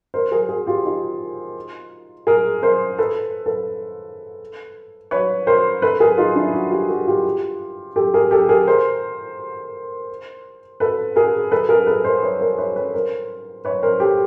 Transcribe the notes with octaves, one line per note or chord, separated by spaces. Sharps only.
A#4 C5
G#4 A#4
F#4 G#4
F4 G4
D#4 F4
G#4 A#4
A#4 C5
A4 B4
A4 B4
B4 C#5
A#4 C5
A4 B4
G#4 A#4
D#4 F4
D4 E4
E4 F#4
F4 G4
F#4 G#4
F4 G4
G4 A4
G#4 A#4
G4 A4
G#4 A#4
A#4 C5
A4 B4
G#4 A#4
A4 B4
G#4 A#4
A4 B4
A#4 C5
B4 C#5
A#4 C5
B4 C#5
B4 C#5
A#4 C5
B4 C#5
A#4 C5
G4 A4